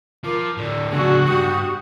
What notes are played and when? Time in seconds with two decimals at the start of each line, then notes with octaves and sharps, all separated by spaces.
0.24 F3 A#4 D6
0.57 A2 D3 D5
0.92 C#2 B3 D4 F#4 G#4 E6
1.27 G2 G4 D#6